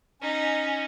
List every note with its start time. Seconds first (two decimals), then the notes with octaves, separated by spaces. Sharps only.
0.21 C#4 D#4